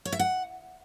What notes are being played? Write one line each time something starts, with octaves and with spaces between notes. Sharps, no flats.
C#5
E5
F#5